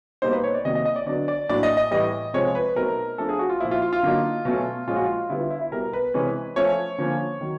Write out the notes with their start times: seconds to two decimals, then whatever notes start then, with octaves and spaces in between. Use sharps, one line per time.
0.22 B2 G3 A#3 D#4 C5
0.33 B4
0.44 C#5
0.54 D5
0.65 C3 D#3 F#3 A#3 D#5
0.75 D#5
0.85 D#5
0.96 D5
1.07 D3 F#3 B3 D4 D5
1.28 D5
1.49 A2 F#3 A#3 D4 D5
1.63 D#5
1.77 D#5
1.91 A2 E3 G3 D#5
2.34 C3 F3 G#3 C4 C#5
2.55 B4
2.76 B2 F#3 A3 C4 D#4 A#4
3.18 F3 A3 D4 A4
3.29 G#4
3.39 F#4
3.49 F4
3.60 A#2 F3 A#3 E4
3.71 F4
3.82 F4
3.93 F4
4.03 D3 F#3 A#3 D#4
4.45 B2 F#3 A3 C#4
4.87 A#2 F3 G#3 C#4 F4
4.96 F#4
5.04 F4
5.30 D3 G3 B3 E4
5.40 F4
5.50 E4
5.61 E4
5.72 B2 G3 B3 A#4
5.93 B4
6.14 C3 E3 G#3 C#4
6.56 F3 A3 C#4 C#5
6.98 D3 F3 A#3 C#4
7.41 D#3 F#3